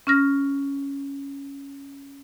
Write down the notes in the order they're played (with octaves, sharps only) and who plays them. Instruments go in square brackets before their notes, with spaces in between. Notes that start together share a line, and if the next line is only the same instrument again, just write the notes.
[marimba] C#4 F6 A#6